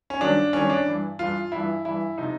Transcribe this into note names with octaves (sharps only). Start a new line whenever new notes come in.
C#4
G2 D#3 F#3 D4
G2 D#3 F#3 C#4
D4
G2 E3
G2 E3 F4
G2 E3 E4
G2 E3 E4
C3 F3 D#4